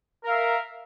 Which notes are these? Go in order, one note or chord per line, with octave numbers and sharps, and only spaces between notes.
A#4 E5 F5